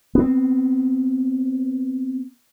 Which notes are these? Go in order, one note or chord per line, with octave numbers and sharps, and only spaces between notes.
B3 C4